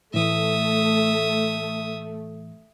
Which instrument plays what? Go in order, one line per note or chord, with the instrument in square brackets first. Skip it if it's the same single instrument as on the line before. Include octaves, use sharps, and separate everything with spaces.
[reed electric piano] A2 E3 [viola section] A3 [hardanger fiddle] E5 D#6